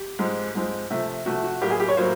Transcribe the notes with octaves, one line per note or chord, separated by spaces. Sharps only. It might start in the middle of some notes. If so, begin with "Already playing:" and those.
Already playing: G4
G#2 F3 G#3 C4
G#2 F3 G#3 C4
C3 F3 A3
C3 F3 A3 F#4
F#4
A2 F#3 A#3 G4
G#4
G4
C#5
A2 F#3 A#3 C5